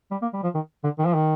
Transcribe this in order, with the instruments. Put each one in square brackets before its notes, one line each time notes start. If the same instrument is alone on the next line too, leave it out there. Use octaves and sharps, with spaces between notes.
[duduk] G3
A#3
G3
F3
D#3
D3
D#3
F3
D#3